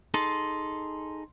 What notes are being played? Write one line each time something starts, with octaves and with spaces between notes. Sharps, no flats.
D#4 G#4 A4 C6